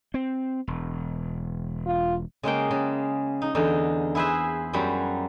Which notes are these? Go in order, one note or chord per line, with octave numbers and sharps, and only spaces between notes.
C4
E1
F4
C#3 G#3 A#3 G5
C#3
D#4
E2 D3 D#4
E4 G#4 B4 C5 E5
F#2 F#3 G3 B5